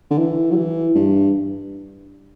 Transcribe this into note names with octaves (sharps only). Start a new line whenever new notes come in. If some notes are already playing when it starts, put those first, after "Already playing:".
D3
E3
F#3
E3
G2